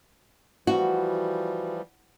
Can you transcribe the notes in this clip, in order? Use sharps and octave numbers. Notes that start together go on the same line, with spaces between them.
E3 F3 G3 F#4